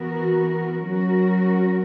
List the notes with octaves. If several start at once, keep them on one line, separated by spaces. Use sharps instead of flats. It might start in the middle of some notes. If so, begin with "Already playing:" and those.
Already playing: E3 B3 F#4 A#4
F#3 C#4 F#4 A#4